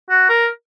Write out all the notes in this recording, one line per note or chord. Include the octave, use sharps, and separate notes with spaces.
F#4
A#4